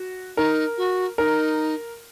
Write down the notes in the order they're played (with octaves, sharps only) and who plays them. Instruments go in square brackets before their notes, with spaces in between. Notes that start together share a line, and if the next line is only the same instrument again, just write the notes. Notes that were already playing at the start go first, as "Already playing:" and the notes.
Already playing: [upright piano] F#4
[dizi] D#4 [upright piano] A#4
[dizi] F#4
[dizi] D#4 [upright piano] A#4